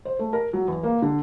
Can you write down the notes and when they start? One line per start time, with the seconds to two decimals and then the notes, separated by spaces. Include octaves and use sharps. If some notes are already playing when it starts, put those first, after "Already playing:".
0.05 C5
0.19 A3
0.33 A#4
0.53 F#3
0.68 E2
0.83 A#3
1.02 D3